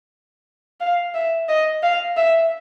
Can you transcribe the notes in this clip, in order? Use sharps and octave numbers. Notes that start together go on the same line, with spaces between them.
F5
E5
D#5
F5
E5